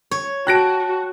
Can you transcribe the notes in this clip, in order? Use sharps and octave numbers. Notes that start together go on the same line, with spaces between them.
C#5
F#4 G5 A5 F#6 A#6 D7